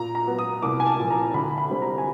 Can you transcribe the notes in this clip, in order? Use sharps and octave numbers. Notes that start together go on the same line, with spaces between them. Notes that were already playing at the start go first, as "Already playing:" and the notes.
Already playing: A#2 A#5
A#5
F#3 B3
D#6
C2 D6
G#5
A5
A#2 F3
A#5
D2 B5
B5
D3 G3 C4
A#5
G#5